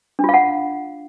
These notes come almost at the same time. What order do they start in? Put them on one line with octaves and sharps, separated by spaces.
D4 F4 F5 F#5